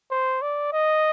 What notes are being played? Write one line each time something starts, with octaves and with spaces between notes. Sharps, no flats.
C5
D5
D#5